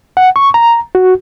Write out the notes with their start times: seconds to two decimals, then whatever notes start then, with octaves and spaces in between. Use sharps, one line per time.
0.17 F#5
0.36 C#6
0.54 A#5
0.95 F#4